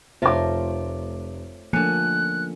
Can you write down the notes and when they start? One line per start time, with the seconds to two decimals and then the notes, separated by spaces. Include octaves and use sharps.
0.22 F1 A3 F4 A#4 C5 C#5 D6
1.73 D3 F3 A3 A#3 C#4 F#6 C#7